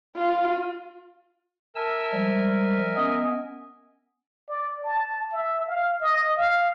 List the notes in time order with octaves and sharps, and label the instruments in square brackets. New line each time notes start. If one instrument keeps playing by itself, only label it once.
[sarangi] F4
[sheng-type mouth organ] A#4 E5 G#5 [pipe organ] A5 E6
[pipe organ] F3 G3 G#3
[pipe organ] B3 C#4 [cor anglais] D#5
[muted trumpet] D5
A5
E5
F5
D#5
F5